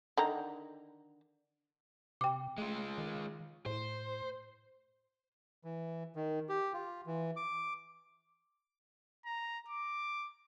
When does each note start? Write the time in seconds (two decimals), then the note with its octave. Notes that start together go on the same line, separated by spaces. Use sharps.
0.17 D3 D#3 A#5
2.21 C3 G5 D6
2.58 G#3 A3 F4
2.98 D#3
3.66 A2 C5
5.64 E3
6.16 D#3
6.49 G4
6.73 F4
7.06 E3
7.36 D6
9.26 A#5
9.69 D6